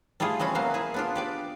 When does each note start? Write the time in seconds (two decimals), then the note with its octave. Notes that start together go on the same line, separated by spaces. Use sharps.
0.20 G3 A3 E4 F4 G#4
0.40 E3 G3 C4 C#4
0.55 F#3 A#3 B3 C5 F5
0.74 E4 G#4
0.94 B3 D4 F4
1.16 G4 B4 D5